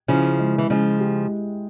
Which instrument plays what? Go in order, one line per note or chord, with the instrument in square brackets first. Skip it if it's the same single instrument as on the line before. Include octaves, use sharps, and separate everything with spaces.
[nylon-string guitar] C#3 F3 [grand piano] E4
[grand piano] G#3
[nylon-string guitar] E3
[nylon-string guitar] C#3 F3 [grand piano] G#3
[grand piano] G4